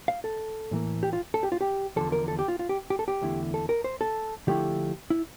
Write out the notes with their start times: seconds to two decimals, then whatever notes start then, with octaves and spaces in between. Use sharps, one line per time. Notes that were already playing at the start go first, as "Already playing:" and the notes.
0.08 F5
0.24 A4
0.71 A2 E3 A#3
1.03 G4
1.13 F4
1.34 A4
1.43 G4
1.52 F4
1.61 G4
1.96 E2 D3 F3 A4
2.12 A#4
2.28 A4
2.39 G4
2.48 F4
2.59 F4
2.69 G4
2.90 G4
2.99 A4
3.08 G4
3.22 E2 D3 A3 E4
3.54 A4
3.69 A#4
3.84 C5
4.01 A4
4.47 D3 F3 A3 E4 G4
5.10 E4